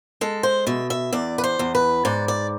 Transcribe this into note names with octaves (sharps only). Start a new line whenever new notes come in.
G#3 A4
C5
B2 E5
E5
E2 D5
B4
C5
E2
B4
G#2 D5
D5